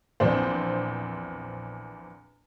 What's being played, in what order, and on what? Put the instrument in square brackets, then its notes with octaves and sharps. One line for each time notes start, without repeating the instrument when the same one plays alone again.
[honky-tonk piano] A#1 E2 C4 D4 C5